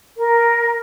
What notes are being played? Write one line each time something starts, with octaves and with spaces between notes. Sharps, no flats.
A#4